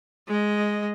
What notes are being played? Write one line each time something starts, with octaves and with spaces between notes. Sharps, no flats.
G#3 D#5